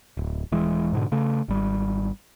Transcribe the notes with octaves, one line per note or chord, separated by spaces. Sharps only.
D1
D#1 E3 G#3
G#2 B2 D3
C#3 A3
G#1 G3